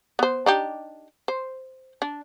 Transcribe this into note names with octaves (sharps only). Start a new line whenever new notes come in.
B3 C5
D4 D#4 G4
C5
D4